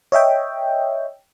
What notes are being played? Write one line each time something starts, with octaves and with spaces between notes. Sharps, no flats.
C#5 D#5 E5 G5